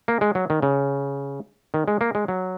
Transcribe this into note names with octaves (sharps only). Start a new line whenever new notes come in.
A#3
G#3
F#3
D#3
C#3
D#3
G#3
A#3
G#3
F#3